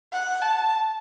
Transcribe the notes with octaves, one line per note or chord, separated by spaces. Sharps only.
F#5
A5